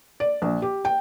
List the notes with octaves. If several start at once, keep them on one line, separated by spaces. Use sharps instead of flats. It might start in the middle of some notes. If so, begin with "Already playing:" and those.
D5
A#1
G4
G5